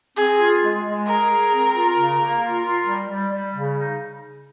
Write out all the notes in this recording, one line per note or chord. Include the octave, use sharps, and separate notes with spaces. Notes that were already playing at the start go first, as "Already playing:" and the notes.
C4 G#4
F4
G#3
G#3
G#4 A#4
G#4
C4
F4
C#3
A#3
F4
F4
G3
G3
G3
C#3
D#4